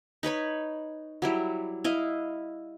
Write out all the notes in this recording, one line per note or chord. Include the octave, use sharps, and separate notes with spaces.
D#4 B4 C#5 B5
F#3 G3 E4
E4 D#5 F5